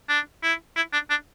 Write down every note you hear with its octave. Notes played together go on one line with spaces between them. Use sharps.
D4
E4
E4
D4
D4